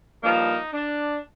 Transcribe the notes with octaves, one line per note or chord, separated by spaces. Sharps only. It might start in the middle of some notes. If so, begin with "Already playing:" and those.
G2 F3 A#3 D#4
D4